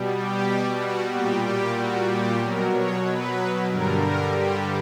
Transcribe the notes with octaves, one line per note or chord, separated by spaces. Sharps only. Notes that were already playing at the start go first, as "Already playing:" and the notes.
Already playing: B2 G3
G4
F#4
A#2 G3 G4
G4
F#4
G4
B2 F#3 A#4
C#5
B4
G2 D3 G3 A#4
A#4
G4